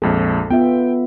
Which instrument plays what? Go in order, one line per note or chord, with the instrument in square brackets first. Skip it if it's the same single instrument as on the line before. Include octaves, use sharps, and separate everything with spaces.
[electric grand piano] A#1 F2 G#3 [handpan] A4
[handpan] B3 F4 E5 [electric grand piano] G5